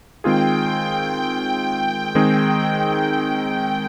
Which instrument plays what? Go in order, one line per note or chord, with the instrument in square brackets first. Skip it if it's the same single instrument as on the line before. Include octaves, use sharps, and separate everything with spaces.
[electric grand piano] D#3 G#3 C4 F4 G#4 [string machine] G5
[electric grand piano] D#3 G#3 C4 D#4 G#4